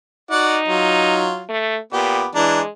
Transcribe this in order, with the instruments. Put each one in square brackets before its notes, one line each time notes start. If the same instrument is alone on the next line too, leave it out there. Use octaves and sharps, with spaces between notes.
[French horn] D#4 [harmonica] F#4 D5 F#5
[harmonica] F#3 F4
[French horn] A3
[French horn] A#2 [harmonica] B3 G4
[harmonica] E3 D4 A#5 [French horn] G#3